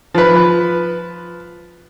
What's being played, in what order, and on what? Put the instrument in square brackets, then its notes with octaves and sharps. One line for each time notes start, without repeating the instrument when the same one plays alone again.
[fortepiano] F3 B4